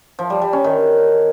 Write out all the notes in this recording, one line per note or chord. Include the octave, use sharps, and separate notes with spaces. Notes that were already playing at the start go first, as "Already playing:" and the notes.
F3
G3
G3
C#4
D#3